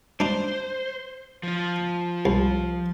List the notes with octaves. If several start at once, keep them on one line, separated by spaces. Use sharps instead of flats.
D4 D#4 C5
F3 F4
C2